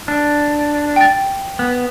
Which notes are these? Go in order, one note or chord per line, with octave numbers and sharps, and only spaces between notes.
D4
G5 A6
B3